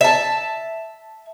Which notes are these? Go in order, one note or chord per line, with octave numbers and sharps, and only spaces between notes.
E5 A5